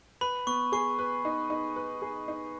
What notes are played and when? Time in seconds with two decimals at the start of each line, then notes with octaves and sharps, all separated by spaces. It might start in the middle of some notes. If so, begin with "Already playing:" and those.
0.21 B4 B5
0.47 B3 C#6
0.72 G#4 C#6
0.99 B4
1.25 D#4
1.50 D#4
1.76 B4
2.02 G#4
2.28 D#4